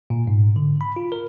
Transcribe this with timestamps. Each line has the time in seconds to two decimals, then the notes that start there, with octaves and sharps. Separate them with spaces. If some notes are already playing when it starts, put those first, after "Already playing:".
0.10 A#2
0.27 G#2
0.56 D3
0.81 B5
0.96 F4
1.12 A#4